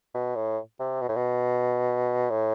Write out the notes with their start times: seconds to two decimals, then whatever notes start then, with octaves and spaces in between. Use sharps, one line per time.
0.14 B2
0.36 A2
0.80 C3
1.01 B2
1.09 A2
1.16 B2
2.30 A2